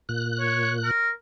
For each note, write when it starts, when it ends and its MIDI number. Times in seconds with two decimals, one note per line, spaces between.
0.09 0.91 46
0.09 0.91 90
0.40 0.71 73
0.84 1.10 70